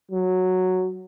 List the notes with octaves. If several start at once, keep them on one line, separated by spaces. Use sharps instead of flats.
F#3